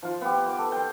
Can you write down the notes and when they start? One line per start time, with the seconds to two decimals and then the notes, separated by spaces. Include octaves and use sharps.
0.02 F3 F4
0.21 B3 G4
0.46 D6
0.59 A4
0.72 G5 C6